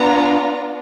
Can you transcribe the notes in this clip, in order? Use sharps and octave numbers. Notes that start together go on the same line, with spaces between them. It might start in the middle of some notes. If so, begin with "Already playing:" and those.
Already playing: B3 D4 F4 A#5